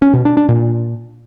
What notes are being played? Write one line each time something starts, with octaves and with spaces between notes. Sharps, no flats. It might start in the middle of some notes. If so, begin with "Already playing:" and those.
C#4
B2
D4
D4
A#2